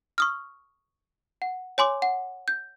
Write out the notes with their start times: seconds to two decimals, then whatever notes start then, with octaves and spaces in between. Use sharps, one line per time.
0.18 C#6 D#6 F6
1.42 F#5
1.78 C#5 G#5 C6 D6
2.02 F#5
2.48 G6